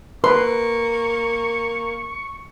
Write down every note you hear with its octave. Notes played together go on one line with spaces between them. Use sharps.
A#3 B4 C6 C#6